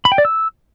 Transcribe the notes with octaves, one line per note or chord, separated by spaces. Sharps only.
B5
G5
D5
E6